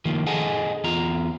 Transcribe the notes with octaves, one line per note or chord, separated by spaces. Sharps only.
D#3 F3 A#3
G#4 A4 D#5 F#5 G#5 A5
E2 F4 A#5